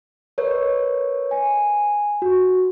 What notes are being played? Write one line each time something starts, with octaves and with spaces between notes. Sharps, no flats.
A#4 B4 C#5 D#5
G#5
F#4